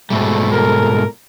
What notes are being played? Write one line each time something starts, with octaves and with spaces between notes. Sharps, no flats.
G#2 B2 G3 A3
A4 A#4